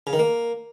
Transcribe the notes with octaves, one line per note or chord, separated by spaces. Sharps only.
C#3
D#3
A#3